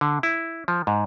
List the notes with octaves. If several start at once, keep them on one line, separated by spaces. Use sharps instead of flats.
D3
E4
F3
G#2